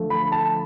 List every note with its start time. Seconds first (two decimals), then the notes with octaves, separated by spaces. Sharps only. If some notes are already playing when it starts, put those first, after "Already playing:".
Already playing: D3 F3 A3
0.10 B5
0.32 A5